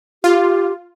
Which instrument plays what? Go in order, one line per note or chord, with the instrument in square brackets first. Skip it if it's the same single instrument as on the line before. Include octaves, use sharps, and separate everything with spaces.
[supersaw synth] F4 [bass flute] G4